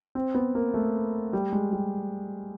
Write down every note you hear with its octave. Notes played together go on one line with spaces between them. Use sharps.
C4
B3
A#3
A3
G3
G#3
G3